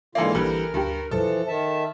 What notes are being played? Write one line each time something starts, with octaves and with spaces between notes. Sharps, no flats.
G#2 D3 E3 A#3 F4
A#1 D3 E3 G3 A#4
D2 G2 G4
B1 F#2 E3 F3 A4
D#3 E5 A5